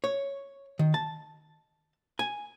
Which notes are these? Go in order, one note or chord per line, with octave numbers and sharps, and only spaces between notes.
C#5
D#3
A5
G#5